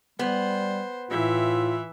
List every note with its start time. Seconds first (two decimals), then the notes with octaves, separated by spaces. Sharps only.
0.19 G3 B3 C5
1.10 A2 E3 F4 E5